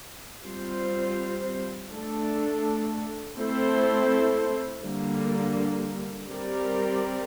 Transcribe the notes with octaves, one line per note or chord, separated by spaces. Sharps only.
G3 C4 F4 C5
A3 D4 A4
A3 C4 E4 A4 C5
D3 G3 A#3
G3 C4 G4 A#4 D5